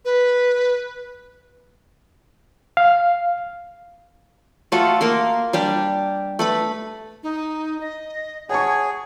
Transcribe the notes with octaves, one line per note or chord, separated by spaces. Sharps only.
B4
F5
A3 F4 F#4 A4
A#3 A#4 C6
G3 D4 G4
A3 B4 B5
D#4
D#5
G#4 C#5 F#5 A5 C#6